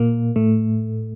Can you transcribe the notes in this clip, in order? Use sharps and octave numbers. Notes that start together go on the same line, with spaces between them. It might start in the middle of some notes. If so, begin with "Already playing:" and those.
Already playing: A#2 A#3
A2 A3